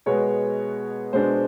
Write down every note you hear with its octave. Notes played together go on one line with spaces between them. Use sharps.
B2 G#3 B3 C#5
B2 G#3 B3 D4 C5